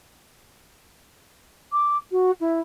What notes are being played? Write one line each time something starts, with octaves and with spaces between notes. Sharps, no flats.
D6
F#4
E4